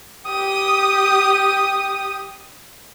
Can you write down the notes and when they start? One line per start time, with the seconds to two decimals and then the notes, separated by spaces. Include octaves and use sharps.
0.27 G4 D#6